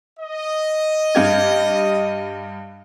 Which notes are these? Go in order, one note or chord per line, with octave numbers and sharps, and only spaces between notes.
D#5
G2 G4 G#6